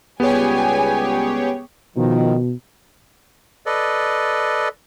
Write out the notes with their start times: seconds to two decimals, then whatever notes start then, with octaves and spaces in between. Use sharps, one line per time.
0.20 C#2 G3 B3 G4 G#4 C#5 G5 G#5
1.97 B2 D#3 F3
3.66 A4 B4 D5 D#5